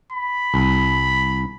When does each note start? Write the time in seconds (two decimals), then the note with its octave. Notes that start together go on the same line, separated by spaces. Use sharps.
0.12 B5
0.54 C2